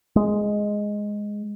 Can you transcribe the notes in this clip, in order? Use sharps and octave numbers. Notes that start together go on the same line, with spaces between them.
G#3